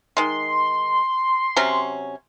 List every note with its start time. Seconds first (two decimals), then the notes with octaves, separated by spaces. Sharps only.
0.17 D#3 G#3 C6
1.56 C3 F#3 C#4